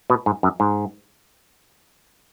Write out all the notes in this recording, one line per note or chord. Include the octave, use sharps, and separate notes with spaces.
B2
G#2
F#2
G#2